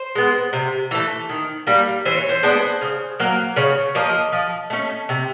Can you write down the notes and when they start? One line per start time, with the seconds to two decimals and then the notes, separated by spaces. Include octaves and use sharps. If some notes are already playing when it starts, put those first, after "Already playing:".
Already playing: C5
0.15 G#3 B3
0.53 C3
0.91 E3 A3
1.29 D#3
1.67 G3 A#3
2.05 E3 C5
2.17 C#5
2.29 C5
2.43 G#3 B3 D4
2.81 C#3
3.20 F#3 A#3
3.56 C#3 C#5
3.95 F3 A#3 D#5
4.32 F3
4.70 A3 C#4
5.09 C3